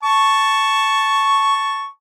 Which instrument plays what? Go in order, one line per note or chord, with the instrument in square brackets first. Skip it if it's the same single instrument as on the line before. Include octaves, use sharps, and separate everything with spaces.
[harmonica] A5 C#6